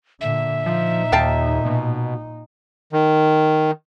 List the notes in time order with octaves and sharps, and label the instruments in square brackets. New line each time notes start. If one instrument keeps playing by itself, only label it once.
[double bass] A#2 D3 [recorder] E5
[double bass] A#2 D#4 [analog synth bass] F3
[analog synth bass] D#2 [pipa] F5 G5 A5
[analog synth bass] B2
[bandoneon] D#3